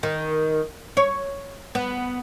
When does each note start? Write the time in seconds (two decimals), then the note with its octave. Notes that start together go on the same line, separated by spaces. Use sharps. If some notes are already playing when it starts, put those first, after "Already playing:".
0.03 D#3
0.97 C#5
1.75 B3